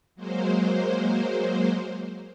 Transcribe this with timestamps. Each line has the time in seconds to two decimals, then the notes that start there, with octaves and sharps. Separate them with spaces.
0.15 F#3 G#3 A#3 C5